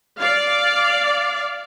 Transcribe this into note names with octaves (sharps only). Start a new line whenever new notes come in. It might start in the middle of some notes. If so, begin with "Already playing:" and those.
D5 F5